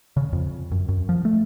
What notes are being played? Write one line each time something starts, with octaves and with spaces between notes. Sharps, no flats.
C#3
F2
F#2
F#2
F3
A3